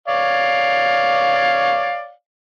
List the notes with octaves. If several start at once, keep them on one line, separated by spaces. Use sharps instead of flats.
C#5 D5 F5